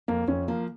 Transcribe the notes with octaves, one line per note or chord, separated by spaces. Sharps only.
F2 A#3
F2 C#4
F3 A#3